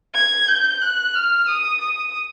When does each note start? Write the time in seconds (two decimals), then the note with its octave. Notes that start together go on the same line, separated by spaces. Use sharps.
0.15 G#6
0.48 G6
0.82 F#6
1.15 F6
1.47 D#6
1.81 D#6